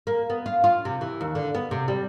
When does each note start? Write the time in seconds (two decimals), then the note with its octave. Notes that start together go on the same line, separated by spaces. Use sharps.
0.07 A#3
0.30 B3
0.46 F4
0.64 F4
0.85 C3
1.01 E3
1.21 D#2
1.35 D3
1.55 B3
1.71 C3
1.88 G3